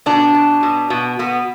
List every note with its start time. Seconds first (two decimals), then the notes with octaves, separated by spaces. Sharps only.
0.06 B2 D4
0.35 B2
0.63 B2
0.90 B2
1.19 B2 B3